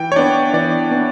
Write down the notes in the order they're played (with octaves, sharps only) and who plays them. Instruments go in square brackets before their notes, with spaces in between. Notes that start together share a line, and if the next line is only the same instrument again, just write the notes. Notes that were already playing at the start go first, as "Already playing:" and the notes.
Already playing: [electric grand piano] E3 G5
C#5
B3 D4 D5
E3 D5
B3 D4